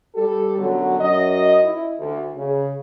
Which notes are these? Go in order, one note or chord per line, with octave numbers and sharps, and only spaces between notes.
G3 G4 A4
F#2 B2 D3 F#3
F#2 D#5
E4
D2
C#3